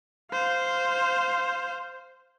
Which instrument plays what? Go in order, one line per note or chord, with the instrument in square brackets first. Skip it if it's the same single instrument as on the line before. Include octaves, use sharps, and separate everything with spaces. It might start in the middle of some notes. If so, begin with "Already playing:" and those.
[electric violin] C5 F5